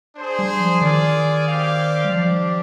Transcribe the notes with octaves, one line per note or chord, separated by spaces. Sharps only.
D4 G#4 C5
G3
F3
D#3 F4 G#4 D5
C4 G4 D5 F5
G3
F3 D4 G4 D5